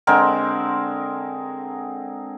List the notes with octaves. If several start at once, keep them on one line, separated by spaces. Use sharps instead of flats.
D3 G#3 C4 A#4